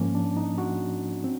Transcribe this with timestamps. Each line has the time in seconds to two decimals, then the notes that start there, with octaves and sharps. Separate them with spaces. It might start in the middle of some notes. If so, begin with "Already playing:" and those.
Already playing: G#2 F3 A#3 C#4
0.15 D4
0.37 D#4
0.58 F#4
1.24 C4